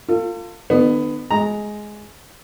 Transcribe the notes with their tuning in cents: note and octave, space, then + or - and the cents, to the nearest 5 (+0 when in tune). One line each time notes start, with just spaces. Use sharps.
F4 +0 A4 +40
D#3 -45 B3 +15
G#3 +10 A#5 +0